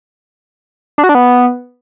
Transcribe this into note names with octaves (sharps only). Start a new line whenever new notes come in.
D4
F#4
D4
B3